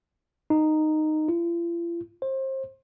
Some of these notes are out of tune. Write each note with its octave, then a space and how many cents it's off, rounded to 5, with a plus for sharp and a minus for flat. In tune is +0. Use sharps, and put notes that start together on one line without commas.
D#4 -10
F4 -45
C5 +30